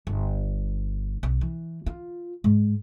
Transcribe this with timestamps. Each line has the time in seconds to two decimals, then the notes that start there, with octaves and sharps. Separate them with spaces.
0.07 G1
1.23 B1
1.41 E3
1.86 F4
2.44 G#2